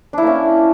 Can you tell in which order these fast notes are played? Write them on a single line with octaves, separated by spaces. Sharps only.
D4 E4 A#3 C#4